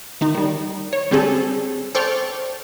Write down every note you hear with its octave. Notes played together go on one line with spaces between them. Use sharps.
D#3 D#4
D#3 G3
C#5
D3 G3 C4 C#4 G#4 A4
A4 C5 D5 G5 C#6 F6